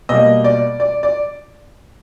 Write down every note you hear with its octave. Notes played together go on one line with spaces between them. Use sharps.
B2 G3 A#3 D#5
D5
D5
D5